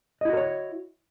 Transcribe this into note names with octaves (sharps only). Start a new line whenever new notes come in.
E4 F#4 A#4 C#5 D#5